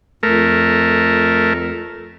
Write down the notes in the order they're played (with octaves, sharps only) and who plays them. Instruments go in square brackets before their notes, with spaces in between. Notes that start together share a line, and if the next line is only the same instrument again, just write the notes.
[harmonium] F2 [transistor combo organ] A3 A#4